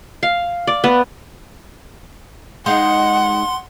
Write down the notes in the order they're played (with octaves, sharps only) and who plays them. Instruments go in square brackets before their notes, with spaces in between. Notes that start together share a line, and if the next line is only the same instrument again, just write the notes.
[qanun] F5
D5
B3
[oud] G#3 D#4 F5 [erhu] F#5 [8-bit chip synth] C6